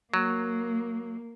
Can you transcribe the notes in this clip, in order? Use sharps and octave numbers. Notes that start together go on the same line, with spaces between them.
F#3 A#3